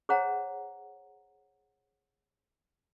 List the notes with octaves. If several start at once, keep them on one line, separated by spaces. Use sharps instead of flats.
G#4 C5 C#5 F#5 A#5